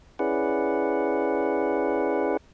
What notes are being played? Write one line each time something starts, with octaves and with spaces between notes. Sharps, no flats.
C#4 E4 G#4 B4 D5 F#5